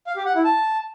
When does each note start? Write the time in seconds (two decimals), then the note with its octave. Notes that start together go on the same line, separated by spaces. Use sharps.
0.07 F5
0.16 G4
0.26 F#5
0.35 E4
0.44 A5